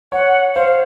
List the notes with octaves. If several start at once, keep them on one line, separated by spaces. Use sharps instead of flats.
C#5 F#5
C5 F5